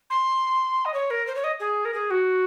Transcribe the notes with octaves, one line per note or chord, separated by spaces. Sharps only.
C6
D#5
C#5
A#4
C5
C#5
D#5
G#4
A#4
G#4
F#4